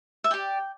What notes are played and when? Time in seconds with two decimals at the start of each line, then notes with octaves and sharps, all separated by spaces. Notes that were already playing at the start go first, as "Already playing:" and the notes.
0.24 E5
0.31 G4 D5 G5